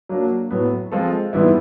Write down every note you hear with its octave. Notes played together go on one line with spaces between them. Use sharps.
F#3 A#3 D4 F#4
A2 F#3 B3
F3 G#3 C4 F4 A4
G#2 E3 G3 B3 E4